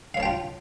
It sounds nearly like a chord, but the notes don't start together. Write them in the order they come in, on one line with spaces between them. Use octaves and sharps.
F5 C#5 A5 G5 F4